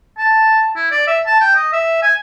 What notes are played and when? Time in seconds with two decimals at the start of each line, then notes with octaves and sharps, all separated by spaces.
0.18 A5
0.76 E4
0.91 D5
1.07 E5
1.26 A5
1.41 G5
1.56 D#5
1.73 E5
2.02 G#5